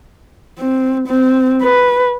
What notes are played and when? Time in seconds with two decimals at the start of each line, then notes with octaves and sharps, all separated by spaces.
0.59 C4
1.08 C4
1.63 B4